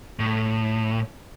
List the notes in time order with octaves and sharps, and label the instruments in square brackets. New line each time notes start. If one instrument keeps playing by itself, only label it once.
[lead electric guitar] A2